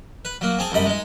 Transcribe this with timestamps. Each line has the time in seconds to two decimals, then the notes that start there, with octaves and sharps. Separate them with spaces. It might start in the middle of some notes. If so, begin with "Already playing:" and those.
0.25 B4
0.41 F#3 A#3
0.59 C4 G#4 A5
0.72 C2 F#2 D#5 B5
0.86 G#3 D#4